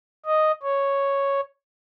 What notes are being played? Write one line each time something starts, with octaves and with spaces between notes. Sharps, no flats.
D#5
C#5